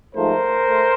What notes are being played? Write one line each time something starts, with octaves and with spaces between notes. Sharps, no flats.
G#2 F3 A3 A#4 C5
A3